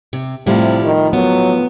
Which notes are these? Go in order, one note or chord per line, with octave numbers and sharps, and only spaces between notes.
C3
A2 C3 F3 G3 E4
D#3
F#3 B3